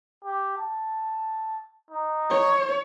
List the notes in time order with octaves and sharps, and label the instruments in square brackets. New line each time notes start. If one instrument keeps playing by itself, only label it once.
[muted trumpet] G4
A5
D#4
[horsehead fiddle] C#5